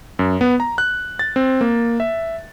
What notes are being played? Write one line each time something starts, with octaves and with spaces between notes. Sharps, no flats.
F#2
B3
A#5
F#6
A6
C4
A#3
E5